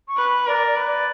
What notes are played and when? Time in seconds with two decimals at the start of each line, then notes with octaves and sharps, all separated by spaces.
0.08 C#6
0.17 B4
0.47 A#4 D5
0.67 D5
0.76 B4
0.87 D5